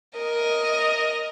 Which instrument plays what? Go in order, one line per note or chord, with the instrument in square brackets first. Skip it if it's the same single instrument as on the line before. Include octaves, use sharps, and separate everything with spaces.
[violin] A#4 D#5